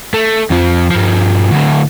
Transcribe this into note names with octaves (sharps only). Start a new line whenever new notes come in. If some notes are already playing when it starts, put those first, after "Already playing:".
A3
F2 F3
G2 F3
D2 A2